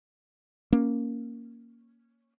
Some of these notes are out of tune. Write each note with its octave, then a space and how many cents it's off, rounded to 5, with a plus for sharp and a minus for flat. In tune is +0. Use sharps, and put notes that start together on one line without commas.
A#3 +0 C#4 +0